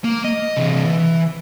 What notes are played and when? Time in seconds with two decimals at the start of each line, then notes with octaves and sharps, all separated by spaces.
0.04 A#3
0.25 D#5
0.57 C3 E3
0.86 E3